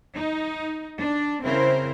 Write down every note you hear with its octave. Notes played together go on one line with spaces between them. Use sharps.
D#4
D4
C#3 C4 E4 A#4 C5